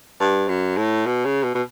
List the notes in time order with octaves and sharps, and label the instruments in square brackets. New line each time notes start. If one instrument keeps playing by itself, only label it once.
[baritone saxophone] G2
F#2
A2
B2
C#3
B2
B2